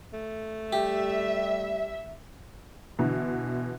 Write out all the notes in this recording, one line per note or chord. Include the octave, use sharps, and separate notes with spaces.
A3
G3 G4 E5
B2 D3 E3